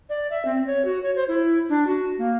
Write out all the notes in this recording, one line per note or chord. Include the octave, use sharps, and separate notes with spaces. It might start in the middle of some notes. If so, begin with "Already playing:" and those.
D5
E5
C4
C#5
F#4
C#5
C5
E4
D4
F#4
A#3